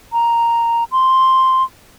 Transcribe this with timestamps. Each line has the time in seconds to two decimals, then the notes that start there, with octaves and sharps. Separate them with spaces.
0.13 A#5
0.92 C6